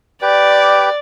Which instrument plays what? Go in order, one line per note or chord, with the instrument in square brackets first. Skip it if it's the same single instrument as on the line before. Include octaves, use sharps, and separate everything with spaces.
[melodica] G4 B4 G5 [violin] D5